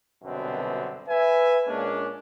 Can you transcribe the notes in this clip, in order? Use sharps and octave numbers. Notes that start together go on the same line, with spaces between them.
C2 F#2 B2 D3 B3 C4
B4 E5 G#5
A#2 G#3 A#3 C#4 D4